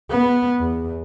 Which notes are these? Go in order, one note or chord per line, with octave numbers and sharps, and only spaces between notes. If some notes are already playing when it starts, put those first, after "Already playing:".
B3
E2